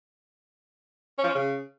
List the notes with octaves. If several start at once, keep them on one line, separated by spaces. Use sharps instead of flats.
C#4
F3
C#4
C#3